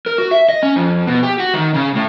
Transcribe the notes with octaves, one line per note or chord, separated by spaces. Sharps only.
A#4
F#4
E5
D#5
C#4
F2
B2
G4
F#4
D#3
C#3
A2